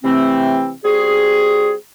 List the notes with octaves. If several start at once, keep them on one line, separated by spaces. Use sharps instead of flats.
C3 E3 A3 C4
G3 C4 F#4 G#4